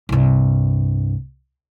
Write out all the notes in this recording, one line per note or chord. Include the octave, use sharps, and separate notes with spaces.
C2 G2